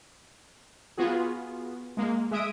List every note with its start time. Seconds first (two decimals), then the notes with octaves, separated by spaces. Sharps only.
0.97 B3 F4 F#4 G#4
1.97 G#3 A#3
2.31 G#3 E5 D#6 D7